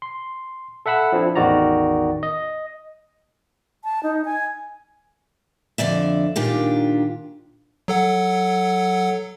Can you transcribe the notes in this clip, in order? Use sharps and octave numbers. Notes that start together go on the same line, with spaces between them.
C6
A4 E5 F#5 B5 E6
F3 C4 D4 E4
A1 E2 D#3 F#4 D5 A#5
D#5
A5
D#4
G#5
F2 D3 D5 E5
A#2 D#3 D4 F4 G4
F#3 A4 F#5